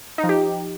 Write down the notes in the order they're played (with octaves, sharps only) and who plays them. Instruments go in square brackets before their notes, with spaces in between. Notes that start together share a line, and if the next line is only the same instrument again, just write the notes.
[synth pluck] D#4
F3
G4